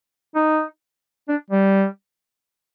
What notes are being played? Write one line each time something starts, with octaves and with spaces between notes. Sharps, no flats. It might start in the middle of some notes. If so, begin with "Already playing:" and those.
D#4
D4
G3